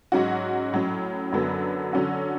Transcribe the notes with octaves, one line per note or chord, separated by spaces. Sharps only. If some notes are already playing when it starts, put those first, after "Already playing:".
G#2 F#3 C#4 F#4
A2 F#3 C#4
F#2 D3 F#3 B3
D3 F#3 C#4 F#4